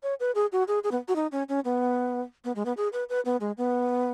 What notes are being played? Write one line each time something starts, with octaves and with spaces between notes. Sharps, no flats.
C#5
B4
G#4
F#4
G#4
G#4
B3
F#4
D#4
C#4
C#4
B3
B3
G#3
B3
G#4
B4
B4
B3
G#3
B3